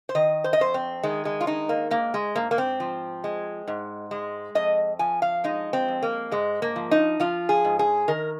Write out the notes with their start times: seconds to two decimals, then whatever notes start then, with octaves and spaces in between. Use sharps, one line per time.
0.09 C5
0.15 D#3 D#5
0.44 C5
0.53 D#5
0.60 F2 C5
0.74 C4
1.03 D#3 G#3
1.25 G#3
1.41 F4
1.47 G#3 D#4
1.69 A#3
1.91 G#2 A#3
2.14 G#3
2.35 G#2 A#3
2.51 A#3
2.58 C4
2.80 F3
3.24 G#3
3.68 G#2
4.11 G#3
4.55 F2 D#5
4.99 F3 G#5
5.22 F5
5.44 G#3 D#4
5.73 C4
5.88 F2
6.02 A#3
6.31 G#2 G#3
6.62 A#3
6.76 F3
6.91 D#4
7.20 F3 F4
7.49 G#4
7.65 G#2
7.79 G#4
8.08 D#3 A#4